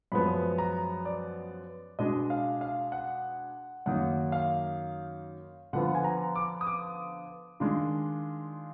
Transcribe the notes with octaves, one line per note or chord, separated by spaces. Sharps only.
F#2 F3 G#3 B3 B5
A#5
D5
B2 G#3 D4 D#5
F5
F5
F#5
F#2 D#3 A#3 D#4 F#5
F5
D3 F3 B3 F4 F#5
G#5
A#5
D6
D#6
D6
D#3 G#3 D4 F4